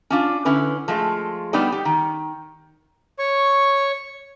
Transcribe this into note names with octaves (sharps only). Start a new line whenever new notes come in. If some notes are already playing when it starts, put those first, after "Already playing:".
C#4 D4 F4
D3 C#4 E4 B4
F3 G#3 A3
G3 B3 D4 D#4 G4 D5
G4
D#3
C#5 C#6